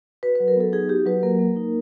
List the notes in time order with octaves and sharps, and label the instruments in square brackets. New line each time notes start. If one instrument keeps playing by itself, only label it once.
[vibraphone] F#4 B4
F#3 B4
A#4
B3 A4
D#4 G#4
F#4 G4
F#3 B4
A#3 A#4
A#3
D#4